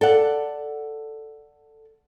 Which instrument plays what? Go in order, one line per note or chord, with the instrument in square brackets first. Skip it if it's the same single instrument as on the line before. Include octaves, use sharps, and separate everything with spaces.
[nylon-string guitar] A4 D5 F#5